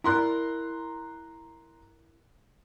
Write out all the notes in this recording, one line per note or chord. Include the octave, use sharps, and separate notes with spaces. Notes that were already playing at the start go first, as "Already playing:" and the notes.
E4 A#4 D5 A#5 C6 F#6